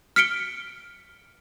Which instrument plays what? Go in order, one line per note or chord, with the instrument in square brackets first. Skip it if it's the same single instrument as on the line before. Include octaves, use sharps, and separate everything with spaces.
[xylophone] F6 B6 C#7 D7 G7